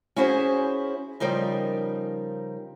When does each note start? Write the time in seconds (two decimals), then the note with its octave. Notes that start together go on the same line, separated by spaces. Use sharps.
0.16 C#4 E4 F#4 G#4 C5
1.20 C#3 F3 G3 D#4 A#4